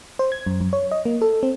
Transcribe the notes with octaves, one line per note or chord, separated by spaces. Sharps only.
C5
G#6
F#2
F#2
C#5
D#5
A#3
A4
C4